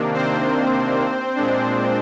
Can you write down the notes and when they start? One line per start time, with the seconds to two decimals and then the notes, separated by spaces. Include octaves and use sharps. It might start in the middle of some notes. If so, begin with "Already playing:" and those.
Already playing: C3 D#3 A#3 D4
0.14 C4 C5
1.35 A#2 G#3 D4